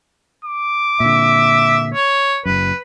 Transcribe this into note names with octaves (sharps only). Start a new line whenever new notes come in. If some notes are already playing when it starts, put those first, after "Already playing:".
D6
A#2 D3 E5
C#5
F#1 F#2 B4